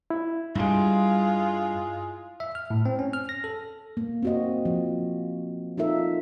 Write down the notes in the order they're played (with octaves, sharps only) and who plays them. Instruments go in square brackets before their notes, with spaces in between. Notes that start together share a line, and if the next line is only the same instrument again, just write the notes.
[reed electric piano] E4
[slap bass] G2 G3 [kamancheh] G#3 F4
[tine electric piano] E5
F6
A2
C4
C#4
F6
A#6
A4
[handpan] A#3
C4 F#4 D#5
F3
D#4 F4 A4 A#4 E5